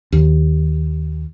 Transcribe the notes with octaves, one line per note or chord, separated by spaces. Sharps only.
D#2